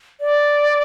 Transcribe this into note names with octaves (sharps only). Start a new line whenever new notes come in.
D5